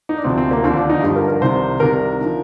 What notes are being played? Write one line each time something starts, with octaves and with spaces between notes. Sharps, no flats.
D#4
D4
D2 C3 F3 C4
C4
A#3
D#2 D3 F3 C4
D4
D#4
G2 D3 F3 G4
A#4
A#4
C2 C3 D#3 C5
C2 C3 D#3 A#4
D3 F3